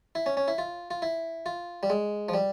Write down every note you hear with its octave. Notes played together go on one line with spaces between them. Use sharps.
E4
C#4
C#4
E4
F4
F4
E4
F4
G3
G#3
F3
G3